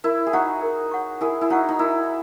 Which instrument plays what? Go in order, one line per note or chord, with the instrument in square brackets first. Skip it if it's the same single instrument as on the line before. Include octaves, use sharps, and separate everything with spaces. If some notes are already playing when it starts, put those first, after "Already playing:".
[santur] E4 [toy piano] A#4
[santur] G#4
[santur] D#4 F#4 [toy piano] C#5 F#5 C#6
[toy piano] A#4
C#5 F#5 C#6
[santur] E4 G#4 [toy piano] A#4
[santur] E4
[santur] D#4 F#4 [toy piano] C#5 F#5 C#6
[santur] D#4
[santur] E4 [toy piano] A#4